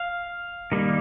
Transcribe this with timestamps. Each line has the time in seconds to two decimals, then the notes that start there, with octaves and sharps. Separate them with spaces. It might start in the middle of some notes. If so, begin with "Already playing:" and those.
Already playing: F5
0.72 D#3 G3 A#3